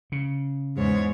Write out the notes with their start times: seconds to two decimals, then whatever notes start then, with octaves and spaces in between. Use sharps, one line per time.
0.12 C#3
0.75 E2 G#2 C#5